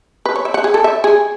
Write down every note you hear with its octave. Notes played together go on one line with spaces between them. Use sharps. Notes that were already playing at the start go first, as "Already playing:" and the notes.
B4
C#5
E5
F#5
G#4
A4
E5
G#4